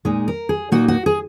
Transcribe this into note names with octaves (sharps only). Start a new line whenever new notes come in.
A#2 G#3 D#4 G#4
A#4
G#4
A#2 A#3 D#4 F#4
F#4
G#4